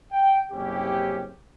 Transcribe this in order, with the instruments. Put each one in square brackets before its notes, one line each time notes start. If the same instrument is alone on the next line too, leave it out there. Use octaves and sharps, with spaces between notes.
[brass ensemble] G5
F#1 C2 C3 C#4 E4 G4